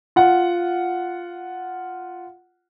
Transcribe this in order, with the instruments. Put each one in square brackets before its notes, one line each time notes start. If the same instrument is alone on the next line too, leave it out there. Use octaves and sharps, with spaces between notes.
[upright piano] F4 F#5